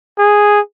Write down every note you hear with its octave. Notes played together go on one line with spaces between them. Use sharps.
G#4